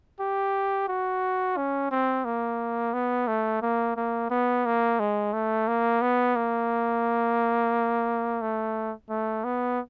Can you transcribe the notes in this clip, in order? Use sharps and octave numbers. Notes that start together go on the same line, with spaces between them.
G4
F#4
C#4
C4
A#3
B3
A3
A#3
A#3
B3
A#3
G#3
A3
A#3
B3
A#3
A3
A3
B3